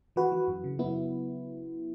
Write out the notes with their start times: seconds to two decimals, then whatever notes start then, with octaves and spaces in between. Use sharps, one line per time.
0.16 E3 F#4 B4
0.32 E3
0.48 F#2
0.64 C#3
0.79 F#3 B3 E4